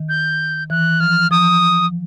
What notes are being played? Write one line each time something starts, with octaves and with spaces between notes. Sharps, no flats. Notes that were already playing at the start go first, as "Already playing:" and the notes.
Already playing: D#3
G6
E3 F#6
F3 F6
F3 D#6